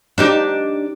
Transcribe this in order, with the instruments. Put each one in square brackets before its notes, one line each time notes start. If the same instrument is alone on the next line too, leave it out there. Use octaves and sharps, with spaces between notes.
[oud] D4 D#4 G4